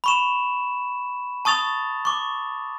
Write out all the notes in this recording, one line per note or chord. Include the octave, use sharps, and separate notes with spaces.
B5 C#6 E7
A5 C#6 D#6 A6 F7
C#6 D6